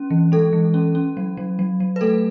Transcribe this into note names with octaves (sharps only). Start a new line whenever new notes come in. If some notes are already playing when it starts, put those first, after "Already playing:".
Already playing: C#4
E3
G#3 A4
E3
C#4
C#4
F#3
F#3
F#3
F#3
B4
A3 A4